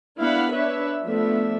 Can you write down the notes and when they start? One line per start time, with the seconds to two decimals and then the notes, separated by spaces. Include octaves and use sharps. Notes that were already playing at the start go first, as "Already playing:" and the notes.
0.19 B3 D4 E4 F5 F#5 B5
0.53 D4 B4 C#5 E5
1.05 F3 A3 B3 D4 E5